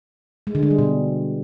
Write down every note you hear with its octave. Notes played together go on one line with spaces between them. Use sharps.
G#3
D3
G#3
G3
B2